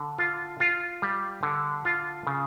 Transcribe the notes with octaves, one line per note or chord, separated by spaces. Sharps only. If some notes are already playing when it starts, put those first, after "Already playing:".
Already playing: D3
F4
F4
G3
D3
F4
C#3